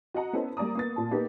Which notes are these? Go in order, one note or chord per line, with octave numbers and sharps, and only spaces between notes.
F#4 D#5 F#5 A#5
B3 C#4 E4 A4 C5
G3 A#3 D5 A#5 D#6
A#3 B3 A6
A#2 A5
A#3 B3 D#4 G4 B4